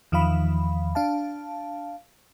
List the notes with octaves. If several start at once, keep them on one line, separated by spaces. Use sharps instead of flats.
E2 D#3 F3 F5 B5
D4 F5 A5